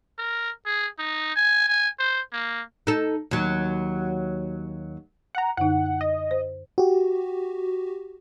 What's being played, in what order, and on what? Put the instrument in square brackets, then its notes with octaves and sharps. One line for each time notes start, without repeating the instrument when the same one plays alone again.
[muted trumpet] A#4
G#4
D#4
G#5
G#5
C5
A#3
[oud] D#4 A4
D#2 F#3
[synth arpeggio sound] F#5 A#5
[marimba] F#2 D3 D#4 [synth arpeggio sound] F#5
[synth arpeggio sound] D#5
[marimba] C5
[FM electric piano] F#4 G4